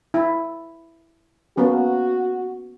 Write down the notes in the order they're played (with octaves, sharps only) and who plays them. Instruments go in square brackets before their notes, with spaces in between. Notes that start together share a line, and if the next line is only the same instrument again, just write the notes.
[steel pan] E4
[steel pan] A#3 B3 C#4 [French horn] F#4